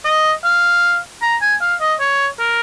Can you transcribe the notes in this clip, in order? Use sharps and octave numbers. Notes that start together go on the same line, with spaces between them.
D#5
F5
A#5
G#5
F5
D#5
C#5
A#4